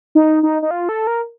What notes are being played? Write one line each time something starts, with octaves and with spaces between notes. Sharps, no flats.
D#4
D#4
D#4
F4
A4
A#4